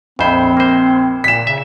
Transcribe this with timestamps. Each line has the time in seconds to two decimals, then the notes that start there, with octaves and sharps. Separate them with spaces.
0.19 A#1 F2 C4 C5 B5
0.57 A#3 C5
1.24 A#2 B6 E7
1.47 C#3 E5